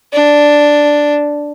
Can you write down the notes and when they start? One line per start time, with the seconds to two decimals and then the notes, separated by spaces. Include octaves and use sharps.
0.13 D4